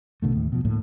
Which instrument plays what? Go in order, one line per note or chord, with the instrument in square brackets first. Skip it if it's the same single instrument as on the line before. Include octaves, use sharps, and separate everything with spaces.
[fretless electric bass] A#1 B2 D3 A3
D#2 A2
B2 F3
D2 A2 A#3